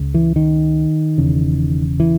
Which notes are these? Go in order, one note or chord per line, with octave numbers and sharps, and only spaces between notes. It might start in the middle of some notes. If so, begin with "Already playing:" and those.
Already playing: C#2 C#3
E3
D#3
E1 E2 C#3
E3